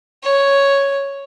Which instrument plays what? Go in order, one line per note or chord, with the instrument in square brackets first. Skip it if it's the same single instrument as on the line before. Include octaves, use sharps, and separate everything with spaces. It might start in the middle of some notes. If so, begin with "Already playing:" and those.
[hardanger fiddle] C#5